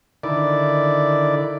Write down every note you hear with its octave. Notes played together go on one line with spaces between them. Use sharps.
D3 D#3 E4 D5